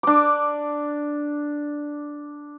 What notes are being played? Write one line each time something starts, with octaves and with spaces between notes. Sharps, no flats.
D4 D6